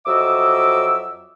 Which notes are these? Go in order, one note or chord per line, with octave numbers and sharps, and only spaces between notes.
F2 F#3 D#5 E5 D6 E6